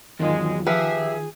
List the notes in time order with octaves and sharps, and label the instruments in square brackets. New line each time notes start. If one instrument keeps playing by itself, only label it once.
[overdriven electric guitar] E2 F#3 [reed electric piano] D#3 F4 [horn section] G#3
[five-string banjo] F3 B4 [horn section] G4 E5 [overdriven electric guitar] G#4